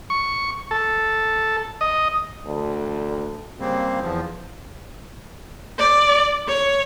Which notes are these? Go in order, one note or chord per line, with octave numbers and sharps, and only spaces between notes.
C#6
A4
D#5
D2
C#3 G3 A#3 C4
E2 F3
D5
C#5